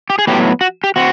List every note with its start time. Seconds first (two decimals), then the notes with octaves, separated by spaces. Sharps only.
0.10 G4
0.19 G#4
0.27 A2 F#3 B3 G4
0.61 F#4
0.84 G4
0.96 C4 F#4